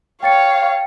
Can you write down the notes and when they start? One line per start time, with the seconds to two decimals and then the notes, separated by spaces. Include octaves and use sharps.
0.23 C#5 F5 G5 A6 C#7